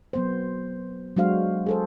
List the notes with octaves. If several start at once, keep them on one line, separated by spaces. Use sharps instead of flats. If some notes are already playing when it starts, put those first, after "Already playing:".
F#3 B3 C5
F#3 G#3 D4 F#4 C5 F5
G#4 A4 C5